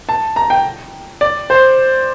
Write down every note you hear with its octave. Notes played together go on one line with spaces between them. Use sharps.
A5
A#5
G5
D5
C5